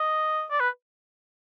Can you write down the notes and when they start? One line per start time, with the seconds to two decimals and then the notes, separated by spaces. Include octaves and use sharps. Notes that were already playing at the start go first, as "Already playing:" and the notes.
Already playing: D#5
0.51 D5
0.60 B4